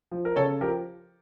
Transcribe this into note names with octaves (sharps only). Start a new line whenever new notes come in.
F3
A#4
C#3 A4 C#5
F3 G4 A#4